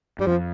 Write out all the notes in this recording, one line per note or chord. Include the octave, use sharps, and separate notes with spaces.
G2 G3
F2 F3